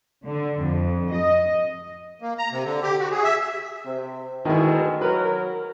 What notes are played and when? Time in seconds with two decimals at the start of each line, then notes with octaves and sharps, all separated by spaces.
0.25 D3
0.61 F2
1.14 D#5
2.22 A#3
2.38 A#5
2.51 C3
2.64 D3
2.83 G4
2.99 F#4
3.11 G#4
3.24 E5
3.85 C3
4.45 D2 B2 D#3 G#3 E4
5.01 F#3 A#4 B4